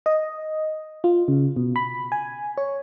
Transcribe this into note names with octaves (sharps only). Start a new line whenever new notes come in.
D#5
F4
C#3
B2
B5
G#5
C#5